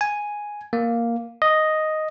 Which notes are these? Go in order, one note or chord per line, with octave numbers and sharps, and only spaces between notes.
G#5
A#3
D#5